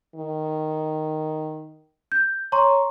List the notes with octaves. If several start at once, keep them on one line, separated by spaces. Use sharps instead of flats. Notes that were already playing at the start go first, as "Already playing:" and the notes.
D#3
G6
C#5 A#5 C6 C#6